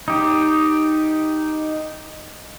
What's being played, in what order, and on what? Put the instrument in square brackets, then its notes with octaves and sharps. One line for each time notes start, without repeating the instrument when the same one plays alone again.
[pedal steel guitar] D#4 G4